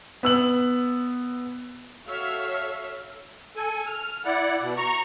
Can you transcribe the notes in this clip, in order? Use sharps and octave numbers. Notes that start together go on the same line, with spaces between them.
B3 E6 F#7
F#4 A4 C#5 E5 F5
A4 G#5
F6
E4 D5 F#5
B2
A#5 C#6